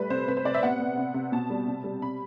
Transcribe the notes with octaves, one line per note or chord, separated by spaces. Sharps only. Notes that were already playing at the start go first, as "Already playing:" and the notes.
Already playing: G3 A3 B4
C3 C5
C3 B4
C5
C3 D5
E5
B3 F#5
B3
C3
C3
B2 A5
G3
C3
G3
C3 B5